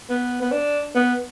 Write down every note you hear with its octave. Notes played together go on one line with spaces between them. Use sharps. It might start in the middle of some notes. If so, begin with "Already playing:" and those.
B3
B3
D4
B3